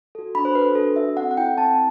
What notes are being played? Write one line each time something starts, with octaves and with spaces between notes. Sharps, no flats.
F#4 A4
D4 B5
C5
F#4 A4 B4
B4
D4 A4
F#4 A4 E5
C4 F#5
F#5
E4 A4 G5
C4 A5